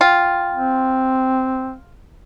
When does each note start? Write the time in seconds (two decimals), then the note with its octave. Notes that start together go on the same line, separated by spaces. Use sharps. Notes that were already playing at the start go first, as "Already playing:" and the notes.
0.01 F4 G5
0.54 C4